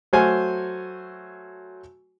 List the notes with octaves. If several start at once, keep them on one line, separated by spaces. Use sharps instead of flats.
F#3 A3 F#4 C5 G#5 F6